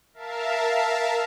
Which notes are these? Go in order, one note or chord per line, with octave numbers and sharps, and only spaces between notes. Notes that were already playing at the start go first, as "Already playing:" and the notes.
A#4 E5 F5 A5